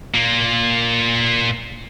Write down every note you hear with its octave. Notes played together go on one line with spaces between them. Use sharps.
A#2 A#3